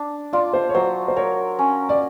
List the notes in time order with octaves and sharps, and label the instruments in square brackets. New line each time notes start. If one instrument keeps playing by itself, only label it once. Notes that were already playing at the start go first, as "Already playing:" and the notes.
Already playing: [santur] D4
[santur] F4 [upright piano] D5
[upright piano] C5
C#5
[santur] F#3 [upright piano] C5
[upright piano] C5
[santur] A#4 [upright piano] C#5
[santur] C#4
[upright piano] D5